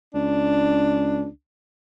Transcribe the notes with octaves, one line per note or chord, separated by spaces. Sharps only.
C#2 D4